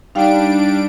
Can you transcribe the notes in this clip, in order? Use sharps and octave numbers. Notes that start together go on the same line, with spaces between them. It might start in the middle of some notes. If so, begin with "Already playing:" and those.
G3 D4 D#4 F5 G5 D7